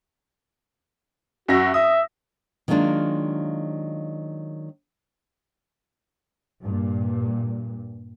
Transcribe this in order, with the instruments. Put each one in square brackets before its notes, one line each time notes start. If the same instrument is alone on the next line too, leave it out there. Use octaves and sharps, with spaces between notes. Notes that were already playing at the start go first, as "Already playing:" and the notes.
[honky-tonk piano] F#2 E5 A#6 [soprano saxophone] F#4
[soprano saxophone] E5 [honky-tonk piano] D#6
[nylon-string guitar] D#3 F#3 G#3 A#3 D4 F4
[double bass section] G2 A#2